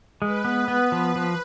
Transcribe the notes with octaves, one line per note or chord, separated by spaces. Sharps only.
G#3 B4
B3
B3
F3
F3